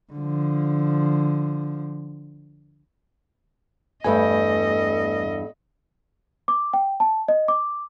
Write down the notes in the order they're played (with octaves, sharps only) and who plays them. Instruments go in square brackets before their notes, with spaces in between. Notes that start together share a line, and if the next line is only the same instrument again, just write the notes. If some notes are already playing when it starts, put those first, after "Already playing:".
[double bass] D3 F3
[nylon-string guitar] E2 G2 G3 [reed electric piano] A3 B4 G#5 [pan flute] A4 [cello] D#5
[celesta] D6
G5
A5
D#5
D6